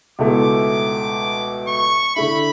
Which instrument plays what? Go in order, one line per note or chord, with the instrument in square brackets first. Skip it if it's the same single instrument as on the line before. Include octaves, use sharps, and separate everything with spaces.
[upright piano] C#2 B2 A3 E4 A4 [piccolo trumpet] D6
[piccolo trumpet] C#6
[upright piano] D3 A3 E4 [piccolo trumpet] B5